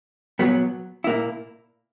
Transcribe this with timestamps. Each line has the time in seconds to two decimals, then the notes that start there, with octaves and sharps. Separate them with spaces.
0.39 A#2 F#3 B3
1.04 A#2 A#3 E4